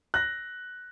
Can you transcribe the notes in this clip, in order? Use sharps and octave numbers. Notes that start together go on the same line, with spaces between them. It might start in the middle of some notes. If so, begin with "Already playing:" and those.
F#6 A#6